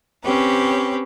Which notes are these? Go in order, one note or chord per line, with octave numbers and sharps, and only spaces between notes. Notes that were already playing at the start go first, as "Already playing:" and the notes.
C4 C#4 G4 B4